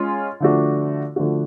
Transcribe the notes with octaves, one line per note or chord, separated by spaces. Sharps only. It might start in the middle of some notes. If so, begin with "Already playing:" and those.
Already playing: G#3 C#4 F4
D3 F3 A3 D4 F#4
D3 F3 A3 D4 F#4